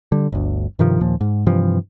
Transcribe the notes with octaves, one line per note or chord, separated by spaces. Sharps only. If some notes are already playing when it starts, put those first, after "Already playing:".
D3 G3
G1 D2
G2 C3 D#3 F3
D#2 A#2 F3
G#2
G2 C3 E3 F3